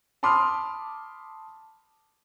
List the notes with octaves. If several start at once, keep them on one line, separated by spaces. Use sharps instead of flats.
A5 B5 C6 D6 D#6 F6